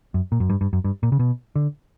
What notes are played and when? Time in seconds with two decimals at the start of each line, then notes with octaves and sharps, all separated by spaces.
0.14 F#2
0.32 A#2
0.40 F#2
0.50 G2
0.61 G2
0.73 F#2
0.84 G2
1.03 A#2
1.12 C#3
1.19 B2
1.55 D3